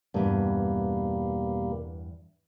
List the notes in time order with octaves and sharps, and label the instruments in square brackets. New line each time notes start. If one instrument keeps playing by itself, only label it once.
[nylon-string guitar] E2 G2 [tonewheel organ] B2 G3 A#3